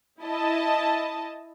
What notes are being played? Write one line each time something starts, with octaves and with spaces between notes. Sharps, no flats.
E4 D#5 A5